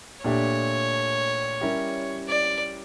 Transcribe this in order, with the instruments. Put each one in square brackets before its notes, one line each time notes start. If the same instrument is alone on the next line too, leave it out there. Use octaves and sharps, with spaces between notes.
[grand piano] A#2 A3 D4 G4 [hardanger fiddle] C#5
[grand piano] G3 C#4 E4 G4 A#4
[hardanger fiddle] D5